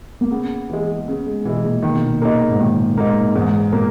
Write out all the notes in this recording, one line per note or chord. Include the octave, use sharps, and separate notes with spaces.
A#3
C#3 B3
E3 G#3
C#3
G#3
B2 E3 G#3
A#2
A#2 D#3
B2
A#2
C#3 A#3 D#4
G#2
A#2 D#3
G#2 A#3 D#4
E2 G#2
A#2 A#3